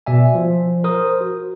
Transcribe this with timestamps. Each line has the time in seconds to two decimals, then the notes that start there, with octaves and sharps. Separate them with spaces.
0.06 B2 D5 E5 G#5
0.34 F3
0.84 A#4 C5 D#6
1.21 F#4